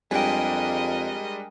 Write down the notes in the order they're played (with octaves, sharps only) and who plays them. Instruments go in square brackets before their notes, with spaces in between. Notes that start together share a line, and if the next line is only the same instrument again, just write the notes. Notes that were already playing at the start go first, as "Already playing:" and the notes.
[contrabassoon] F2 [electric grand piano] G3 G#3 D4 [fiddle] A#4 D#5 [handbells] G5 G#5